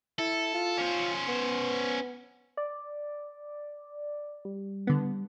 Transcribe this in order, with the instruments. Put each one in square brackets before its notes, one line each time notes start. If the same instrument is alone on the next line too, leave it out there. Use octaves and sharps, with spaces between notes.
[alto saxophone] E4 [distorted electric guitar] A4
[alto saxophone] F4
[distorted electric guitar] C#4 C5
[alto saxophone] B3
[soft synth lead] D5
G3
[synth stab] D3 B3